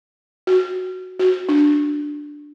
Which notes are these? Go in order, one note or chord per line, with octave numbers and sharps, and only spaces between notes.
F#4
F#4
D4